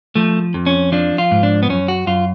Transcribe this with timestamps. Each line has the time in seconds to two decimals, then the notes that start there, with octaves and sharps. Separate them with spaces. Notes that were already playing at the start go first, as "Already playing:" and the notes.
0.15 F3 A3
0.54 F2
0.66 C#4
0.92 F3 D4
1.18 F4
1.31 G#2
1.43 D4
1.63 B3
1.69 F#2 C#4
1.88 F#4
2.07 F#2 F4